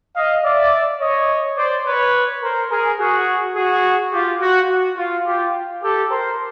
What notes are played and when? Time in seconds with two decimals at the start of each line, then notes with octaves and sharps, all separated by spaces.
0.15 D#5 F5
0.44 D5 E5
1.00 C#5 D#5
1.57 C5 D5
1.85 B4 C#5
2.42 A#4 C5
2.70 G#4 A#4
2.99 F#4 G#4
3.55 F#4 G#4
4.13 F4 G4
4.41 F#4
4.69 F#4
4.97 F4
5.26 F4 G4
5.82 G4 A4
6.11 A#4 C5